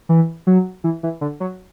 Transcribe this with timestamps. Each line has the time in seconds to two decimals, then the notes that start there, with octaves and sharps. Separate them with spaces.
0.09 E3
0.47 F#3
0.84 E3
1.03 E3
1.21 D3
1.40 F#3